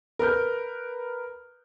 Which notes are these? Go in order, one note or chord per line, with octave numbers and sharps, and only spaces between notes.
A#4 B4 F6 G6